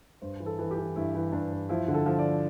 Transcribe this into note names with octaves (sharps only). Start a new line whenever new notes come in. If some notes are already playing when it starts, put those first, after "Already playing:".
G2 C5
E3
A4
E3
G4
E3
G2 E4
E3
G2 D4
G2
F3 E4
D3
A4
F3
D5